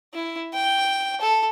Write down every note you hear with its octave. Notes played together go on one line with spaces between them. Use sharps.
E4
G5
A4